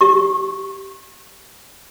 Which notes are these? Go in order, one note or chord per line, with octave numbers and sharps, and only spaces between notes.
G4 C#6